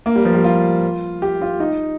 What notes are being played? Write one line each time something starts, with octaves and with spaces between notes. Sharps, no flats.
A#3
G3
F3
G3
F4
G4
F4
D#4